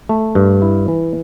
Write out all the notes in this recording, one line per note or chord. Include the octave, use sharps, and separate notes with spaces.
A3
G2
E4
E3